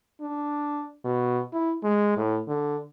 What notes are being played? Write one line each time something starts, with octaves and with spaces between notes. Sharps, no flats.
D4
B2
E4
G#3
A2
D3